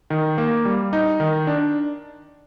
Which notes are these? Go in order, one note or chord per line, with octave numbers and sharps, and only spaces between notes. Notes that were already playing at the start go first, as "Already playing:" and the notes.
D#3
A#3
G3
D#4
D#3
D4